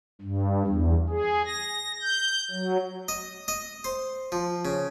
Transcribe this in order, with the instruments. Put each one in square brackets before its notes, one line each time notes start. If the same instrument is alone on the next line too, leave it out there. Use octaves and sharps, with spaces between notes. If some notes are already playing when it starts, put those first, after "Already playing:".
[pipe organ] G2
E2
G#4
A#6
G6
F#3
[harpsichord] D#5
D#5
C5
F3
C#3